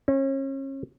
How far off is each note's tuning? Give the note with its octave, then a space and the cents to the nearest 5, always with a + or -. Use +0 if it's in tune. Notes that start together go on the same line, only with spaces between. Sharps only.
C#4 -35